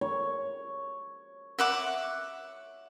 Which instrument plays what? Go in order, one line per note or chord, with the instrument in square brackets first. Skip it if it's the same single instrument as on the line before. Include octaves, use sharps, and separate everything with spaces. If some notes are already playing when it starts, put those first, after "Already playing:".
[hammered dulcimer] C#5
[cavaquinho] E5 F#5 D6